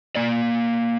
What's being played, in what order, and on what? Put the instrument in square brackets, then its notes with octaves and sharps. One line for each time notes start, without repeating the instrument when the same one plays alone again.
[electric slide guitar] A#3 D5